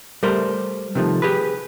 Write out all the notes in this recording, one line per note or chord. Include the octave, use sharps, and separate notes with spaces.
G3 A3 A#4 C5
C3 D#3 F3 A3
G4 G#4 B4